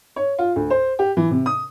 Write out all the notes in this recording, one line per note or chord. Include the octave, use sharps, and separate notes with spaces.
C#5
F4
D2
C5
G4
E3
C3
D#6